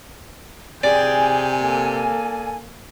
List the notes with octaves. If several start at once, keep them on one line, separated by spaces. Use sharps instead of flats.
C3 G#4 D5 G5 G#5
A#3 A4